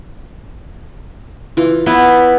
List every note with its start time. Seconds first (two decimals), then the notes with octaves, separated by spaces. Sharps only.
1.57 E3 F4
1.86 B3 E4